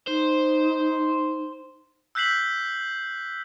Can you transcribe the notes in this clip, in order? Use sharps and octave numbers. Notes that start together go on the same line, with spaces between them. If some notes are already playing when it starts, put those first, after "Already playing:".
D#4 C5
E6 F#6 G6 B6 C7 F#7